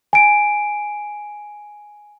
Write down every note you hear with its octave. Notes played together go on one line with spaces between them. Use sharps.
G#5 D7